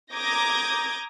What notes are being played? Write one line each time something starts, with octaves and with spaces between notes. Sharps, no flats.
A#5 D6 D#6 G6 G#6 A#6